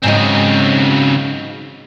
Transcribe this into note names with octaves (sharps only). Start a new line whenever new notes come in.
G#2 C#3 F#3 C4 D#4